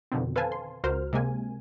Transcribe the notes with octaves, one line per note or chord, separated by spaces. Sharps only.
F2 B2 D3 D#3 C4
A4 B4 C5 F5 G#5 A5
C6
C#2 F#4 A#4 C5 F6
C3 G#3 A#3 G#5